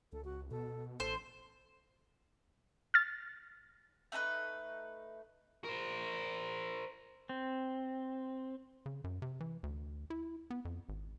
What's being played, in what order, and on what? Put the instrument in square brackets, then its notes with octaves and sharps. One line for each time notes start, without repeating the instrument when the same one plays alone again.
[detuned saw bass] C#2 [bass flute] A4
[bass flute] F#4
[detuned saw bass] B2 [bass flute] A4
[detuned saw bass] A1 [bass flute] A4 [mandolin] C5
[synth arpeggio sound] F6 A6
[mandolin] A3 D#4 A4 B4
[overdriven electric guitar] A#4 C5
[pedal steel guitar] C4
[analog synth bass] C#3
F#2
C3
E3
D2
E4
B3
F2
G#1